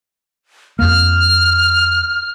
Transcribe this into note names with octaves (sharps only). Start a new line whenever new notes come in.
F2 A#3 F6